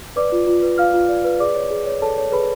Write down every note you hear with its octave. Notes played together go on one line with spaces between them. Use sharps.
B4 D5 D6
F4
F4
B4
F4 F5 F6
F4
D5
B4
G#4 D5 D6
C#5
G#4
C#5
A4 C#5 A5
C#5
G#4 B4 B5